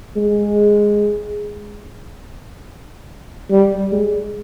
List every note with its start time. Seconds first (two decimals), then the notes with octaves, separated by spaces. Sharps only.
0.16 G#3
3.50 G3
3.92 G#3